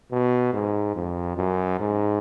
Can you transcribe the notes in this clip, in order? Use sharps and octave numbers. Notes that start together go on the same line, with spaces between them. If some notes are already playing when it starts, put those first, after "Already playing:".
B2
G#2
F2
F#2
G#2